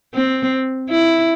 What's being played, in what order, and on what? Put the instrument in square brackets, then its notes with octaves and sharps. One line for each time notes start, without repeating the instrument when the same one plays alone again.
[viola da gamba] C4
E4